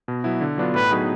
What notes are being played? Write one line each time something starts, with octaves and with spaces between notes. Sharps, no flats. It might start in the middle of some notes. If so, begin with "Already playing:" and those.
B2
F#3 B3 E4
D3
F#3 B3 D4 F4
A2 B4
F#3 B3 D#4 G#4